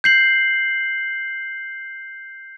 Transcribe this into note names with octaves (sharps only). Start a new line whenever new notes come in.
G6 C7 F#7